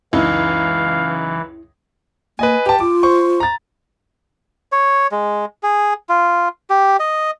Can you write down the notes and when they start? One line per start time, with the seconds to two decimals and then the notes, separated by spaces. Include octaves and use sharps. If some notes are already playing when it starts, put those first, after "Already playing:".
0.13 C#2 F#2 E3 D#4 E4 F5
2.39 A#3 B4 D#5 G#5
2.66 G4 B4 A5
2.80 F4 D6
3.03 C5 C#6
3.40 A#5 A6
4.72 C#5
5.12 G#3
5.63 G#4
6.09 F4
6.70 G4
7.00 D#5